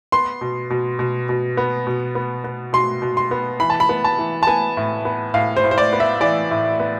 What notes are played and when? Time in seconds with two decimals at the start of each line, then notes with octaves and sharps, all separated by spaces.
0.12 B3 C6
0.41 B2
0.70 B2
0.99 B2
1.29 B2
1.57 B3
1.87 B2
2.15 B3
2.44 B3
2.73 B2 C6
3.02 B2
3.17 C6
3.31 B3
3.60 E3 B5
3.70 A5
3.80 B5
3.89 B3
4.04 A5
4.19 E3
4.43 A5
4.47 B3 G#5
4.77 A2
5.05 B3
5.34 A2 F5
5.57 C5
5.64 A2
5.71 C5
5.78 D5
5.93 B3
6.00 E5
6.21 E3 D5
6.51 A2
6.80 B3